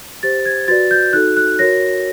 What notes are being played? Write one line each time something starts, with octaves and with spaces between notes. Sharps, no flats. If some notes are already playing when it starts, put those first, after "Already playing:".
G4 C5 A6
G#6
F#4 B4 D5 A6
G6
D#4 F#4 A4 F#6
F#6
F#4 A#4 C#5 A#6